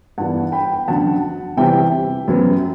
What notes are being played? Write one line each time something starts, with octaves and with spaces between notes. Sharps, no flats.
G2 E3 B3 D4 F#5 A5
G5 B5
F#2 D3 F#3 F#5 A5
C3 E3 G3 E5 G5
F#2 F#3 B3